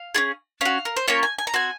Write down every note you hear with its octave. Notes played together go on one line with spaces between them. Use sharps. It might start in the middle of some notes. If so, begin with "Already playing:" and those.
Already playing: F5
C#4 F4 G#4
C#4 F#4 F5
A#4
C5
A#3 C#4 F4 C#5
G#5
G#5
A#5
C4 F#4 G#5